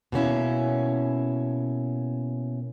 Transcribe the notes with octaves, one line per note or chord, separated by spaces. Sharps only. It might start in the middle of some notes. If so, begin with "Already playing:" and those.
B2 A#3 C#4 E4